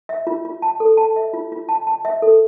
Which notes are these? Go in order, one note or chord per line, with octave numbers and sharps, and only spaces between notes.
E5
F4
F4
A5
A4
A5
E5
F4
F4
A5
A5
E5
A4